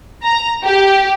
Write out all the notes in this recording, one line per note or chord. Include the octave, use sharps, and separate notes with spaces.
A#5
G4